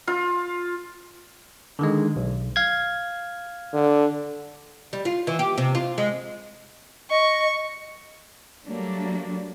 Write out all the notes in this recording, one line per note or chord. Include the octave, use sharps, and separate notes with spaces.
F4
D3 D#3 G#3
B1
F5 G#6
D3
G3
F4
E3
G4
C3
F4
G#3
D#5 C#6
F#3 G3 A3 A#3 D4